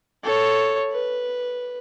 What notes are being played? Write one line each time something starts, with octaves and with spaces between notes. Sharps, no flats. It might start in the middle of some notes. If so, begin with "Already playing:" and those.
A4 C#5
B4